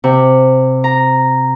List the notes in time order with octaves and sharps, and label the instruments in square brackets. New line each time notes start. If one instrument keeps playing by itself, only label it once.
[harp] C3
A#5